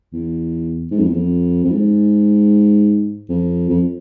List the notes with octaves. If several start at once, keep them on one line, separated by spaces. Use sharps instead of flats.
E2
G#2
F2
E2
F2
F2
G#2
F2
F2